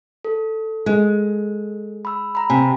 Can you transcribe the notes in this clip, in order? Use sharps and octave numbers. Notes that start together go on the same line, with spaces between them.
A4
G#3
B5 E6
A#5 B5
C3 G#5